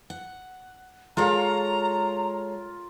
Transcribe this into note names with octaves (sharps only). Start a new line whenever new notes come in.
F#5
G#3 F4 A4 A#4 C#5 F5 A#5